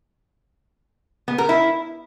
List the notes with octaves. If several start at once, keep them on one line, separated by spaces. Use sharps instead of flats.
B3
A#4
E4